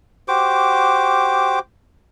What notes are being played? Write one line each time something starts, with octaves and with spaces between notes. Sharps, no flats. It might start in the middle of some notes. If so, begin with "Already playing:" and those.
F#4 G4 C5 D6